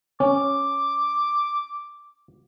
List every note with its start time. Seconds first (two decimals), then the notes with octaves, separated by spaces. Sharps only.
0.20 C#4 D6